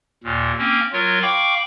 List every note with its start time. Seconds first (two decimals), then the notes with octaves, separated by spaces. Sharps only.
0.24 D#2 A#2
0.59 A#3 C4 C#4
0.93 F#3 F4 A#4 C#5
1.22 F5 G5 B5 C#6 D6